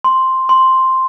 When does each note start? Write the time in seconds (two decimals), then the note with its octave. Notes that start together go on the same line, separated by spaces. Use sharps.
0.04 C6
0.49 C6